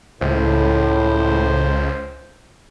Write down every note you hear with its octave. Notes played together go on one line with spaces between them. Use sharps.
C#2 A2 C5